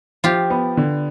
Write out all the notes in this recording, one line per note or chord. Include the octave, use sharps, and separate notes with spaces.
F3 F4 G4
B3
D3